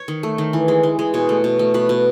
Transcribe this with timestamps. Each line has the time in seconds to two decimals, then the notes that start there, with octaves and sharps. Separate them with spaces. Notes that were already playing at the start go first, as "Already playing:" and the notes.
Already playing: C#5
0.08 D#3
0.23 A3
0.38 D#3
0.53 E3
0.68 G#3
0.83 E3
0.99 G#3
1.14 B2 C#5
1.29 A3
1.44 B2
1.59 A3
1.74 B2 B4
1.89 B2